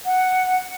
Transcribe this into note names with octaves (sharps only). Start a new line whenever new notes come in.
F#5